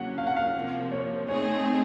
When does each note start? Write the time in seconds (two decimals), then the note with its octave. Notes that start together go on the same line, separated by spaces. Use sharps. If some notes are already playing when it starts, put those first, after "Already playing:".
Already playing: C#3 F#3 A#3 C#4 F#5
0.18 F5
0.27 F#5
0.36 F5
0.54 C3 F3 A#3
0.92 C#5
1.29 A3 C4 D#4 G#4 C#5